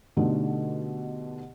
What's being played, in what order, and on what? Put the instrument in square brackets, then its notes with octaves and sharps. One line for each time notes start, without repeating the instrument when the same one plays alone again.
[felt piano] B2 D3 A3 D#4 G4